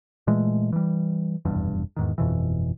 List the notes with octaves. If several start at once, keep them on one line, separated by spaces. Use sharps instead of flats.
A#2 E3 G#3 A3
E3 G3
F1 B1 E2 G2
E2 G#2 D#3
G1 F2 B2 E3